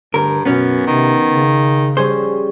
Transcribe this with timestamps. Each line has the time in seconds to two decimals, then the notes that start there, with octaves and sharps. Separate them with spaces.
0.14 D2 G2 A#4
0.45 F#2 B2 B3 C#4
0.87 C3 D#3
1.29 C#3
1.97 G3 C#4 G#4 C5